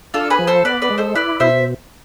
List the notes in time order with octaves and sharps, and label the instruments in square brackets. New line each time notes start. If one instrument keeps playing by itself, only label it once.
[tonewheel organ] D4 [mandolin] F4 A4
[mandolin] G#4 B4
[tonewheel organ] F3
[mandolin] A4 C5
[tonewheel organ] B3 [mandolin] B4 D5
[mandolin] B4 D5
[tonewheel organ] G#3
[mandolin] A4 C5
[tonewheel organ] E4 [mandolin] B4 D5
[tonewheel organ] B2 [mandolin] C5 E5